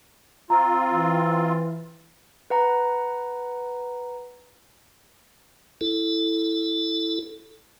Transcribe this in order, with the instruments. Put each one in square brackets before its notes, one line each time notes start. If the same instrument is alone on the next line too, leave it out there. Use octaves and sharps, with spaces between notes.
[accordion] C4 F4 [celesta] A#5
[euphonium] E3
[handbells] B4 F#5 A#5
[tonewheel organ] E4 A4